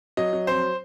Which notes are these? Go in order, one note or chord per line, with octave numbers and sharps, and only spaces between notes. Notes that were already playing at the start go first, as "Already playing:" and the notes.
F#3 D#5
F#3
F2 C5